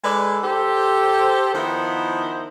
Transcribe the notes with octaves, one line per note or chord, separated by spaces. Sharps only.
G#3 D#4 A4 B4 D5
G4 A4 C5
D#3 F3 B3 D#4 E4 C5